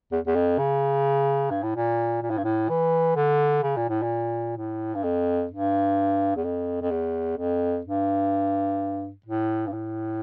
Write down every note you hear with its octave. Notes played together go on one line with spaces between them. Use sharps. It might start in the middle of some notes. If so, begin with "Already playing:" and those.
E2
E2
F2
C#3
G2
A2
A#2
A#2
A2
G2
A2
E3
D3
C#3
A#2
A2
A#2
A2
G2
F2
G2
E2
F2
F2
E2
F2
G2
A2
G2
A2